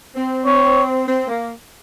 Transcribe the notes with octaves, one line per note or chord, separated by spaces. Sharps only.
C4
C4 C#5
C4
A#3